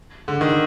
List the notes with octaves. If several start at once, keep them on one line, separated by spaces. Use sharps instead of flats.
D3
D#3